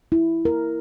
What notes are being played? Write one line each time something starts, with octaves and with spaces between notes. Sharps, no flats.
E4
A#4